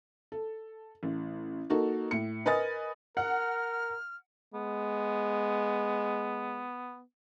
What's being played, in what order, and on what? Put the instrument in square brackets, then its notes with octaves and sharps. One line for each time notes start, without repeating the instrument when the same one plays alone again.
[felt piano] A4
A1
A#3 D#4 F#4 A4
A2 C#7
A#4 B4 D#5 G#5 D#6 A6
[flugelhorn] A#4 [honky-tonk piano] F#5 [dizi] F6
[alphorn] G#3 [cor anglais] B3